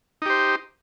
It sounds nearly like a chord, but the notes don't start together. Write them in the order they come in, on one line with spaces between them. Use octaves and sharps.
D#4 G4 C5